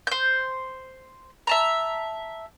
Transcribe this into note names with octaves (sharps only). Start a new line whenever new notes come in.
C5 G6
E5 A5 A#5